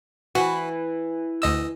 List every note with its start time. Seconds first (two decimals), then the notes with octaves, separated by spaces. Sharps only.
0.35 E3 F#4
1.42 D2 D#5 E6